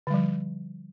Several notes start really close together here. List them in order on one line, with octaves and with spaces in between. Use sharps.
D3 G3 F3